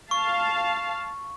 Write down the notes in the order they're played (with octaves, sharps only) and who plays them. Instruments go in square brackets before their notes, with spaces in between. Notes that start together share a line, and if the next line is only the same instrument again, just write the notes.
[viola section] F5 A5 [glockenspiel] C#6